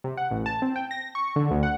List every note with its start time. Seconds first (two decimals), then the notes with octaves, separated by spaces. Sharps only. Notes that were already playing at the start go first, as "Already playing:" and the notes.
0.04 C3
0.17 F#5
0.31 A1
0.46 A5
0.62 C4
0.76 G5
0.91 A#6
1.15 C#6
1.36 D3
1.51 D2
1.63 F#5